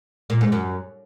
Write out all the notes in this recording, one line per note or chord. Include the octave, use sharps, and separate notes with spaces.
A#2
G#2
F#2